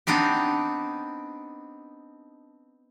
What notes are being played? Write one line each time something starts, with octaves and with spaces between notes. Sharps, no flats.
B3 C4 D4 D#4 G4